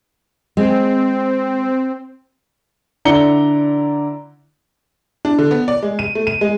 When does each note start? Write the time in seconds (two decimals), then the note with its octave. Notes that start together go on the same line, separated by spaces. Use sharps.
0.57 G#3 C4
3.05 D3 E4 D5 A#5 C#7 G7
5.25 D4
5.38 D3
5.51 B3
5.68 D5
5.83 G#3
5.99 D#7
6.15 A3
6.27 D#7
6.41 G#3